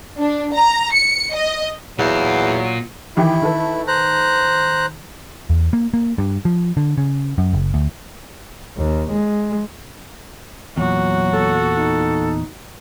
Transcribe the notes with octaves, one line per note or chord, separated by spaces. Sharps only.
D4
A#5
C#7
D#5
E2 A#2 F#3 F5
D#3 E3 E4 G4
D#3 A4 B4
C5 A#5 F#6
E2
A#3
A#3
G2
F3
D3
C#3
F#2
F#1
D2
D#2
G#3
E2 A#2 F#3 F#4
A4
D#4